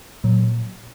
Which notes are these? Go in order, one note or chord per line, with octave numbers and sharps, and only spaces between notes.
A#2 F#3